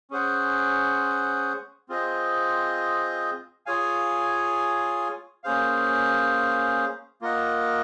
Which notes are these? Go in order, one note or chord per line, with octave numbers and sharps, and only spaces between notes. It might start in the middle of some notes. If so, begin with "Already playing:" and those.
C#4 G#4 C5 F#5
C4 F4 G#4 C5 D#5
F4 G#4 C#5 F5 G#5
A#3 C#4 G#4 C5 F5
A#3 F4 A#4 D#5 F#5